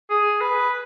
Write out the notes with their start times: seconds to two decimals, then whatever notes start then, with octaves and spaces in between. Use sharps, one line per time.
0.10 G#4
0.41 B4